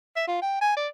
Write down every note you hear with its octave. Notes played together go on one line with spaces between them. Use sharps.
E5
F4
G5
G#5
D5